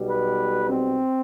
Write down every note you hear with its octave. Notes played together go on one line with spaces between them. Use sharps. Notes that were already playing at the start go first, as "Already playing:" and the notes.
Already playing: B1 B2 G3
B4
C4